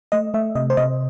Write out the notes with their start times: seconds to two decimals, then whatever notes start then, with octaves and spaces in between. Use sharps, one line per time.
0.12 A3 D#5
0.34 A3 E5
0.55 C3 D#5
0.70 C5
0.77 C3 D#5